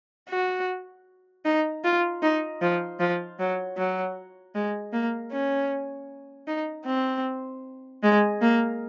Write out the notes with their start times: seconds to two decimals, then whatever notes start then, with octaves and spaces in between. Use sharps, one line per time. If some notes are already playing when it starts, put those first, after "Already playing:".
0.29 F#4
1.45 D#4
1.84 F4
2.23 D#4
2.62 F3
3.00 F3
3.39 F#3
3.78 F#3
4.55 G#3
4.93 A#3
5.32 C#4
6.48 D#4
6.86 C4
8.03 G#3
8.42 A#3